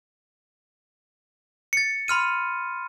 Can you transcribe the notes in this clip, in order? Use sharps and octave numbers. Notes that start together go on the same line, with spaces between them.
A6 C#7
B5 C6 F6 D#7